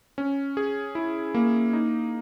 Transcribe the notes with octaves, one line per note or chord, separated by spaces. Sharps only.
C#4
G#4
E4
A#3
D#4